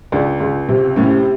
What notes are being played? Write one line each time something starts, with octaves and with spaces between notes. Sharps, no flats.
C#2 D4
C#2
C3
A2 C#4